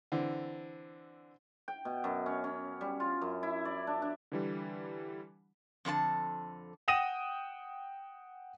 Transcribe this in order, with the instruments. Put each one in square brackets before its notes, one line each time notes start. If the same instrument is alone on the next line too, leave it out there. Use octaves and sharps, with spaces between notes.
[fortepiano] D3 E3 C4
[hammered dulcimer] G5
B2
F#2
C#4
C#4
G3
F4
F#2
E4
D5
D4
D4
[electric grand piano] D3 E3 G3
[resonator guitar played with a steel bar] F2 D3 E4 A5
[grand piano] F#5 G5 D#6 A#6 D#7 E7